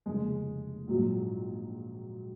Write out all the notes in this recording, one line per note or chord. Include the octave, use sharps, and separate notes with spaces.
F1 D#2 C#3 G#3
A#1 G#2 F#3